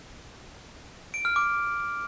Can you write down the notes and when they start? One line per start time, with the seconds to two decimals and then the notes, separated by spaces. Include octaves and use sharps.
1.14 D7
1.25 F6
1.36 D6